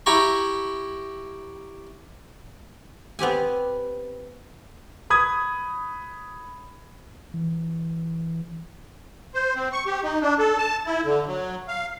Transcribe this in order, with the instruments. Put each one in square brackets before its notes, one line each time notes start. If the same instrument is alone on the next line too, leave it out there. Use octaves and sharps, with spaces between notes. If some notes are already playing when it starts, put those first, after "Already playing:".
[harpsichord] E4 G4 A#5 C#6
[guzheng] B3 C4 G4 G#5
[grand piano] B5 D#6 G#6
[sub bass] E3
[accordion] C5
C4
C#6
G4
D#4
D4
A4
A5
E4
D3
F#3
F5